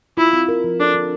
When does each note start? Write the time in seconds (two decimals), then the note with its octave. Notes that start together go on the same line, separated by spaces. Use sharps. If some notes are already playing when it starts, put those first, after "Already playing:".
0.17 E4 F4
0.33 C4
0.48 A#4
0.64 F3
0.80 D4 A4
0.95 D4